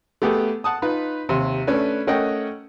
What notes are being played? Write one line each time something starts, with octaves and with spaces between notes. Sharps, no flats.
A3 B3 G4 G#4
F#5 A5 D#6
D#4 F4 B4
D#2 C3
A3 C#4 D4 B4
A3 C#4 A#4 D#5 F#5 G5